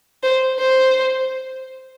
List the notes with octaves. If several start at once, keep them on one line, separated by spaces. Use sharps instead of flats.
C5
C5